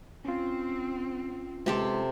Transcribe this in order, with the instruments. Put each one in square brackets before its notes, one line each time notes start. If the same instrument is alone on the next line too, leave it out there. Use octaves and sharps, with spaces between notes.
[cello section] C4 [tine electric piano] C#4 F4
[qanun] C3 G4 A4 [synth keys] G#3 C6